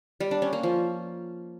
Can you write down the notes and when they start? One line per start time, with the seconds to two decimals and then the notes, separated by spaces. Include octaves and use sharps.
0.20 G3
0.31 D4
0.42 C#4
0.53 A#3
0.63 F3